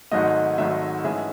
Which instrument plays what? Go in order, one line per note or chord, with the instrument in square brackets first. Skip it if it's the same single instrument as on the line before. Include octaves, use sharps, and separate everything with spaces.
[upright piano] G#1 G#2 F#3 A3 [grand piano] D#5
[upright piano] G#1 G#2 F#3 A3 [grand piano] E5
[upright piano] G#2 E3 A3 C#4 G#4 [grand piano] E5